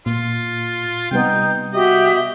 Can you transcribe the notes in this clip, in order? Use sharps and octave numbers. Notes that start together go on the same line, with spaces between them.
A#2 F4
C3 G3 B3 D#4 G5
F#4 G4 D#5 E5